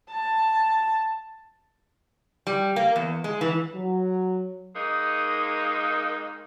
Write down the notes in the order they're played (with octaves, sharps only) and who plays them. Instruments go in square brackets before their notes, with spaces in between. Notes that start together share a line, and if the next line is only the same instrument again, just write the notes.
[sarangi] A5
[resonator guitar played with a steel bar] G3
A#3
E2
G#3
E3
[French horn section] F#3
[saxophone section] D#3 G#3 A#3 D#4